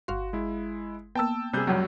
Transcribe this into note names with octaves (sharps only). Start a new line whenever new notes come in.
G1 F#4 F5 C6
G#3 E4
A#3 B3 G5 A5 E6
C3 G3 G#4 F#6 G6
C#2 F#2 F#3 G3